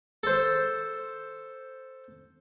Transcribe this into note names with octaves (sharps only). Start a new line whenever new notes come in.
A4 C5